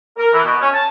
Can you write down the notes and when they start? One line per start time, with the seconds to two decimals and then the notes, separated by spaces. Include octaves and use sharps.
0.18 A#4
0.33 E3
0.44 B2
0.61 C#4
0.74 A5